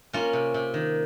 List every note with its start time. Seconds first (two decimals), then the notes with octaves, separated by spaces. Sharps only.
0.13 A#3 C#4 F4
0.33 C3
0.54 C3
0.74 D#3